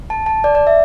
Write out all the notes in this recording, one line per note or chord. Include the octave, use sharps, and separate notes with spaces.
A5
A5
D5
D5
E5